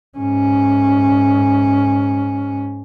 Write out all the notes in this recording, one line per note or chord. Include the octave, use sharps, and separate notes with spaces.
G#2 C#4